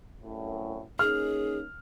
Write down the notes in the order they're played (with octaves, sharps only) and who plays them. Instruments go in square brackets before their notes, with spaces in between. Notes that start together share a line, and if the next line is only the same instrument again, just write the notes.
[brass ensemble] C2 F#2 A2
[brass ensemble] A#3 C#4 D#4 [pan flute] G#4 [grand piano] F6